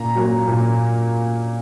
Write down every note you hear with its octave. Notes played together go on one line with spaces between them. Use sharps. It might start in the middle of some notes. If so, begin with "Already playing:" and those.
Already playing: A#2 A#5
F#3 A#3
A#2